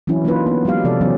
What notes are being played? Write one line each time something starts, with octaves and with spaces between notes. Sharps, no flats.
E3 F#3 C4 C#4 E4
F#3 A#3 D4 D#4 F4 B4
B3
F#3 G#3 G4 F5
C3 F3 A4 D5
E3 F#3 B3 C#4